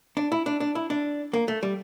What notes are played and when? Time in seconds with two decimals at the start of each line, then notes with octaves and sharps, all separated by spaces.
0.17 D4
0.32 E4
0.46 D4
0.60 D4
0.75 E4
0.90 D4
1.33 A#3
1.48 A3
1.63 G3